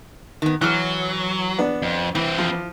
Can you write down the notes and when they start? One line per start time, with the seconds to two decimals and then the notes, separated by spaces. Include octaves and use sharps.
0.42 D#3 B3
0.61 E3 F#3 F6 F#6
1.58 B3 D4
1.82 F2
2.15 E3 C4 B4
2.38 F3